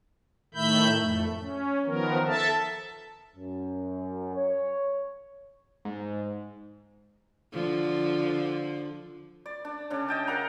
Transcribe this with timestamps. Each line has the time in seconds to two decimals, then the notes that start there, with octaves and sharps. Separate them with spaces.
0.54 A2 D#3 A3 E5 B5 G6
0.98 F2 A3
1.41 C#4
1.86 D#3 F3 B3 A#4
2.27 A4 E5 A5
3.36 F#2
4.35 C#5
5.85 G#2
7.53 D3 F3
9.46 D5
9.65 D4
9.90 C#3 D4
10.08 D#5 G5 A5
10.27 A#4 F5 F#5 A#5